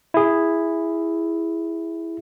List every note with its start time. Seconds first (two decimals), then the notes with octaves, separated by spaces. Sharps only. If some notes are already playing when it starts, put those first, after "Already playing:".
0.14 E4 G#4